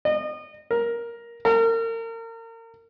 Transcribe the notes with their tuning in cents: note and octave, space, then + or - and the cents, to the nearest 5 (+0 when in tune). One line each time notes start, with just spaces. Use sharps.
D#5 -30
A#4 +10
A#4 -35